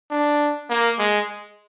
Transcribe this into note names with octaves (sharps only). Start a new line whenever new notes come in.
D4
A#3
G#3